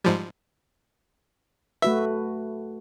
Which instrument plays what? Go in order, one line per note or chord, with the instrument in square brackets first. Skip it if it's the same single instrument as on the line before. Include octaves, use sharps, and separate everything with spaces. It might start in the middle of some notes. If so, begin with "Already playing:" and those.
[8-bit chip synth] G#2 F3 G3
[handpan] A3 F#4 B4 [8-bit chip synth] E5